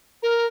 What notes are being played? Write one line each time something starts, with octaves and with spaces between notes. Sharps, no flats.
A#4